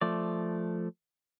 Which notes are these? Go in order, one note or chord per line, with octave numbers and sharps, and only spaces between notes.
F3 A3 D5